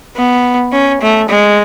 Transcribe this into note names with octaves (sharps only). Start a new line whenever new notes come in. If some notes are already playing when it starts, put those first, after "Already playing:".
B3
C#4
A3
G#3